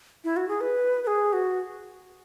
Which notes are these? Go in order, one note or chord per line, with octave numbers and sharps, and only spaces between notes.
E4
F#4
G#4
B4
B4
G#4
F#4